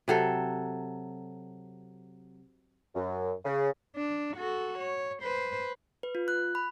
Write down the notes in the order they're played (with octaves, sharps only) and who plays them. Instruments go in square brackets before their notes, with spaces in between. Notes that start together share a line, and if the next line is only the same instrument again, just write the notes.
[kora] C3 F#3 A4
[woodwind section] F#2
C#3
[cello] D4
F#4 A4
C#5
B4 C5
[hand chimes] B4
F4
F#6
B5